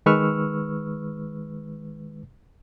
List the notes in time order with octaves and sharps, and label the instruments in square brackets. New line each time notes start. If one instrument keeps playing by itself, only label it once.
[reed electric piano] D#3 G#3 B4 C#6 E6 F6